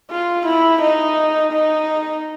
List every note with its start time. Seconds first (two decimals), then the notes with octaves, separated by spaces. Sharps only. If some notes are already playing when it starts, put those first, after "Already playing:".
0.11 F4
0.46 E4
0.82 D#4
1.52 D#4